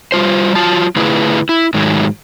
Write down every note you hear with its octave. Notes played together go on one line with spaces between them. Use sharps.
G3 F4 C5
F#3 F4 A5
D3 A3 E4 F4 G#4 B4
E4
G#2 D#3 F#3 G#3 A3